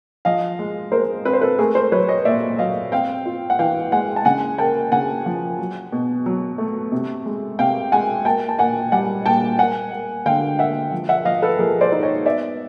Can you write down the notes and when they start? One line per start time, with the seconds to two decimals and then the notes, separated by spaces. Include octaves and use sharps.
0.25 F3 D#5 F5
0.59 G#3
0.92 G#3 A#4 C5
1.25 C4 B4
1.33 C5
1.42 A4 B4
1.59 A3 G#4 A#4
1.75 A#4 C5
1.92 F#3 B4 C#5
2.08 C#5 D#5
2.25 A#2 D5 E5
2.59 F#3 D#5 F5
2.92 C4 F5 G5
3.26 F4
3.50 F#5
3.59 E3 F5 G5
3.92 G#3 F#5 G#5
4.16 A5
4.25 C#3 F#5 G#5
4.58 A#3 G5 A5
4.92 C#3 F#5 G#5
5.26 F3
5.58 F#3
5.92 B2
6.26 F#3
6.58 A3
6.92 C3
7.26 G#3
7.59 C3 F5 G5
7.92 G#3 F#5 G#5
8.25 A#3 G5 A5
8.49 A5
8.59 A#2 F#5 G#5
8.92 G3 F#5 G#5
9.26 A#2 G5 A5
9.59 A#3 F#5 G#5
9.92 A#3
10.25 D3 F5 G5
10.59 A#3 E5 F#5
10.92 F3
11.09 E5 F#5
11.25 F3 D#5 F5
11.42 A4 B4
11.59 F3 G#4 A#4
11.81 C5 D5
11.92 D#4
12.03 C#5 D#5
12.25 B3 D5 E5